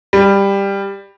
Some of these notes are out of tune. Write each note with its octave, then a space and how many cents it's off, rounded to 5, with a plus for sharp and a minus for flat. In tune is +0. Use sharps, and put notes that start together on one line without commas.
G3 +15